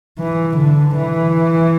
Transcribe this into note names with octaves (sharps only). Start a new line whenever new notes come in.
E3
D3
E3